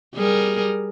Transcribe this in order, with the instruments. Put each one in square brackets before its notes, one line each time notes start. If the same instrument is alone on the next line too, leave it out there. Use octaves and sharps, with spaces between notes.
[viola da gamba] G3 G#4 A#4